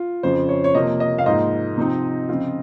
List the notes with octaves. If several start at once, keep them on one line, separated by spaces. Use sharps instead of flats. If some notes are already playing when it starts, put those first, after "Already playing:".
Already playing: F4
F2 C#3 F3 C5
C#5
C#5
C3 F3 A#3 D#5
D#5
F5
G#2 F3 A#3 D#4 D#5
C3 F3 C4 D#4
C#3 F3 C4 F4